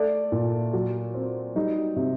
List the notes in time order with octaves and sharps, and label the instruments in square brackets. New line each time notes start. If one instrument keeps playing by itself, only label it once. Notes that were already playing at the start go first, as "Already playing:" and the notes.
Already playing: [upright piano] A3 D5
A#2
F#3
C4
G3 D#4
C3